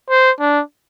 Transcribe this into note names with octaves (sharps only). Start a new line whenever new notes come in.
C5
D4